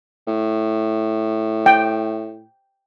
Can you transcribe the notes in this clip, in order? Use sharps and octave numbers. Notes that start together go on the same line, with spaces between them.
A2
G5